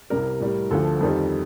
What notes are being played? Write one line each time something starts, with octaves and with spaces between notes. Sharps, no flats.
C2 C3 G3 A#4
A2 G3
D2 D3 F3 A4
F2 D#3 G3